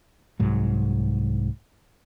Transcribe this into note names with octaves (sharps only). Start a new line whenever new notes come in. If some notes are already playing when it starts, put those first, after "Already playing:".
C2 G#2 F#3